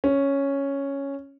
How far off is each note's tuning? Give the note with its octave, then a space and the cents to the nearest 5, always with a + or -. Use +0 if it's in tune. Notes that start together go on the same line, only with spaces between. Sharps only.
C#4 +0